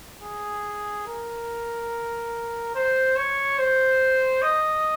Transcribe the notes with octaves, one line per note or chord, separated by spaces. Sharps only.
G#4
A#4
C5
C#5
C5
D#5